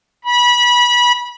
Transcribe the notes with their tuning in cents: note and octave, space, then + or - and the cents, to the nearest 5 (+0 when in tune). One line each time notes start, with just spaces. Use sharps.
B5 -25